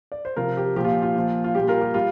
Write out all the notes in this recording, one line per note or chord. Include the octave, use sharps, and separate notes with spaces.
D5
C5
C3 F3 F4 A#4
G4
A#2 F3 G4
F4
F4
A#2 F3
F4
A#2 G3 G4
F4 A#4
G4
G3 F4